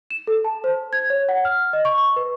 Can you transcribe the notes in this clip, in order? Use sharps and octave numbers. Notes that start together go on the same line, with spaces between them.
E7
A4
A5
C5
G#6
C#5
F#5
F6
D#5
C#6
C#6
B4